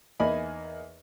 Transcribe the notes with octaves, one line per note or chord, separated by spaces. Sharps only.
E2 A#3 D#4 D#5 G#5 B5